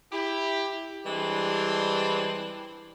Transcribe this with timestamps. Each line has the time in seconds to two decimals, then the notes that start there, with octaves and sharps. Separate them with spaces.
0.11 E4 G4
1.05 E3 G3 G#3 C4 D4